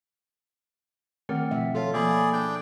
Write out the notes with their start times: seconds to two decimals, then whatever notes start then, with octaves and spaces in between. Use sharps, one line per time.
1.29 D#3 A3 C4 G#4 A#4 F#5
1.51 B2 F3 E5
1.75 F4 A4 C#5 G5
1.94 F3 A#3 G#4 D5 B5
2.33 D4 G5